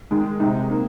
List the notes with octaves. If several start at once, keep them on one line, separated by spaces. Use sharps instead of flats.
D#3 G#3
C3 D#3 G#3 D#4
D#3 A#3